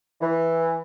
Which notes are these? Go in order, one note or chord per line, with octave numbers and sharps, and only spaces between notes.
E3